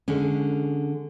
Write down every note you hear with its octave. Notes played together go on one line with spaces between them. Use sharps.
D3 G#3 C#4